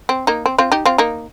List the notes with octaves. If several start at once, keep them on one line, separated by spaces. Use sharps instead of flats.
C4
A#3 D#4
C4
C4 F4
D#4 G4
C4 F4
A#3 D#4